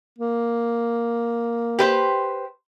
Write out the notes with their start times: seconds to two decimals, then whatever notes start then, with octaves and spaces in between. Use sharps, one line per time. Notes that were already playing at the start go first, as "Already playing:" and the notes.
0.18 A#3
1.79 G4 B4 C5